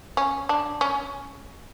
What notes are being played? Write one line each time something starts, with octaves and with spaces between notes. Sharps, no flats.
C#4
D4
C#4